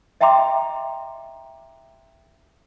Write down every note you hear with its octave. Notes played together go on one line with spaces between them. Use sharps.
D#5 E5 G5 A#5 C6 D6